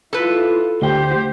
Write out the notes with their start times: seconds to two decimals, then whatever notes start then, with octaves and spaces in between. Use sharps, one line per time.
0.13 E4 F4 A4 B4
0.82 D2 G4 C5 G5